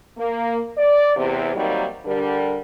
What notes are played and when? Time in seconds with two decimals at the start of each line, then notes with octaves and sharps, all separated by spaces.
0.17 A#3
0.76 D5
1.15 E2 C3
1.54 D#3 F#3 G3 A#3 C4 D#4
2.05 D3 G3 A#4